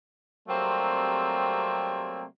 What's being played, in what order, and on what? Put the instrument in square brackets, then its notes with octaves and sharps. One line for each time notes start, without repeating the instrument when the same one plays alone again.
[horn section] C3 F#3 G3 A3 A#3 C4